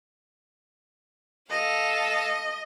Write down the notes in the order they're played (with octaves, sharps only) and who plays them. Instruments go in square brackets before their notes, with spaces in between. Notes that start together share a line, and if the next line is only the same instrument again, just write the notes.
[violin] A4 F5 [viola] D#5